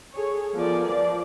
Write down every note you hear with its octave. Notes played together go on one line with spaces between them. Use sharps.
G#4 A4 C#5
F3 B3 A4 A#4 D5 G#5
F3 D5